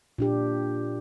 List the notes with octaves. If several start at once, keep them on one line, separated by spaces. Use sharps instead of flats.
A#2 D4 G4